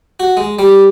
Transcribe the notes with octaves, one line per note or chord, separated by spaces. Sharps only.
F#4
G#3
G3